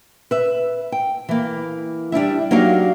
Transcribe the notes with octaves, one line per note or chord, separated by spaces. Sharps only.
B4 E5
G5
E3 A#3
G3 D4 E4 E5
F#3 A#3 D4 D#4 G4 F5